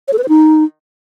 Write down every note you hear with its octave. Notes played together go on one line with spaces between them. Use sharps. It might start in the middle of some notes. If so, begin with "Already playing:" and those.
C#5
A4
B4
C5
D#4